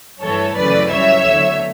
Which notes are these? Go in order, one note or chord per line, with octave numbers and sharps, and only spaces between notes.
G2 E3 A3 A4 C#5
F#2 C#3 E3 A3 B4 D5
F#2 E3 G3 C#5 E5
E2 D3 F#3 A3